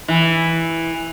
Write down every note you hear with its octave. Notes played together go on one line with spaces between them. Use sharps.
E3